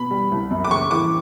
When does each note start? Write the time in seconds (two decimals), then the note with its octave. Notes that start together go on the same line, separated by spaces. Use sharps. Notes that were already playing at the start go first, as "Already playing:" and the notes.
Already playing: B2 B5
0.11 G3
0.32 C2
0.51 F#2
0.64 D6
0.71 C#3 C#6
0.91 E3 D6